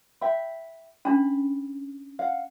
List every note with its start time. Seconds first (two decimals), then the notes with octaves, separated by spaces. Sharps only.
0.21 E5 G5 B5
1.05 C#4 D4 B5
2.19 F5 F#5